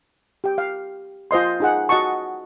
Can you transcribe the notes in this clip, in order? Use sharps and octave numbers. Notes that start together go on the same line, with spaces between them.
G4 G5
F5
F4 C5 D#5 C6
D#4 G#4 F#5
F#4 D#5 F#5 A5 C#6